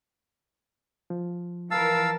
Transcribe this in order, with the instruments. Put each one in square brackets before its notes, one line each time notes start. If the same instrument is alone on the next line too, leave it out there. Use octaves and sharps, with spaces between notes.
[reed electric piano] F3
[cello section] E3 A#4 [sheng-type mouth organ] F5 E6 [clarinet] A5